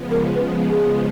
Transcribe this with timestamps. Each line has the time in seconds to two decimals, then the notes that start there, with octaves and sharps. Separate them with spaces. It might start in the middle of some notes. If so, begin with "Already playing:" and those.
Already playing: C#3 F3 G#3 B3
0.11 A#4
0.35 B4
0.68 G#4